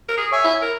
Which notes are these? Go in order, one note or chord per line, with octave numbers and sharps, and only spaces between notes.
A#4
G#4
C#5 E5 G#5
E4
A#4